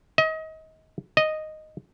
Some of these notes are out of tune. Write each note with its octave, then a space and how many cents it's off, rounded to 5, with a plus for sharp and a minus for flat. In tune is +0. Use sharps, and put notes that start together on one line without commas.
D#5 +30
D#5 -5